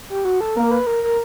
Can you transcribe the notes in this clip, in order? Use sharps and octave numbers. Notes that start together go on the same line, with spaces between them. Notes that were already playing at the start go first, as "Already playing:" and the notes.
G4
F#4
A4
A#3 A#4
B4
A#4
A#4